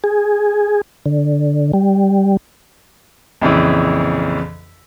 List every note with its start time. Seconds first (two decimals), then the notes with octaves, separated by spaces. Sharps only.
0.04 G#4
1.06 D3
1.73 G3
3.41 A#1 F2 C#3 E3